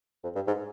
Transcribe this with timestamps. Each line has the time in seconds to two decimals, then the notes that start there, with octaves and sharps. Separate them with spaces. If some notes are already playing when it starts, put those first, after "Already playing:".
0.24 F2
0.35 G2
0.47 G#2